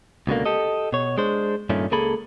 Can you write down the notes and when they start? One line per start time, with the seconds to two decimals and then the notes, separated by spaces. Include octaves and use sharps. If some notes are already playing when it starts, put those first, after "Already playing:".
0.27 C#2 B2 D3 A#3
0.46 G4 A4 D#5
0.93 B2 C#5
1.18 G#3 D4 C5
1.70 G2 A#2 D#3 A3 C#4
1.91 C#2 A#3 G#4 A4 B5